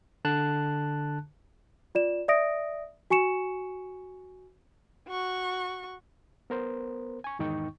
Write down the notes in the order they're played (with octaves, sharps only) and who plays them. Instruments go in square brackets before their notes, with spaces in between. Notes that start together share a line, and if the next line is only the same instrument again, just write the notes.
[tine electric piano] D3 A5 F#6
[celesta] F4 D5 E7
D5 E5 D#6 A#6 D7
F#4 G#5 C#6 C#7 E7
[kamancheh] F#4 C#6
[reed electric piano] B3 A#4 C5
G#5 C#6
E2 G#2 D#3 D#4 G5 C#6